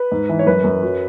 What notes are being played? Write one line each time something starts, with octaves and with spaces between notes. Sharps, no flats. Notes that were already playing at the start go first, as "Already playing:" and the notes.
Already playing: B4
G#2
E3
C#5
F#2 B4
F#2
F#3